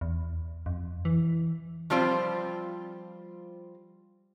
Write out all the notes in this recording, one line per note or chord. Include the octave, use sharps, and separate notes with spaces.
E2
F2
E3
F3 G3 C4 F4 C5